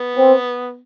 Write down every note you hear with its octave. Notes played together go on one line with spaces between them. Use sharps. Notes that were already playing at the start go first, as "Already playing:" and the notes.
Already playing: B3
C4